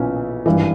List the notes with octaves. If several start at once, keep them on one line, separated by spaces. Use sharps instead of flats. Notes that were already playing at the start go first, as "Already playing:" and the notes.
Already playing: B1 A#2 B3 C#4 E4
G#1 G2 E3